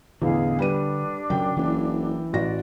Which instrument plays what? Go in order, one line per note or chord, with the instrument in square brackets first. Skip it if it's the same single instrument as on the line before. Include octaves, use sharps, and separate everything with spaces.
[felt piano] A1 E2 [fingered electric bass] D3 [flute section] G#4 D#5 F5
[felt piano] G3 B4 D#7 [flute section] D4
[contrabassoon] F#2 [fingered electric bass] C#3 F#3 [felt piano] G5
[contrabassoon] F#1 [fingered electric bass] E3
[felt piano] A1 F#4 A#6 [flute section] D5